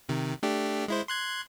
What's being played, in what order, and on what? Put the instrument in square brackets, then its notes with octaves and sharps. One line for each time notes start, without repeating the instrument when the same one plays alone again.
[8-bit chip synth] C3 D#3
A3 D4 G4
G#3 E4 C5
C6 F#6 G#6